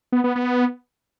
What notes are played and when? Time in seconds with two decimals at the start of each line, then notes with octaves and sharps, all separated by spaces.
0.12 B3
0.24 B3
0.35 B3